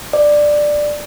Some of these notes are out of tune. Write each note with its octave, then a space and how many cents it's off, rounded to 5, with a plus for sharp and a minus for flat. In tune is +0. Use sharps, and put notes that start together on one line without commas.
D5 +10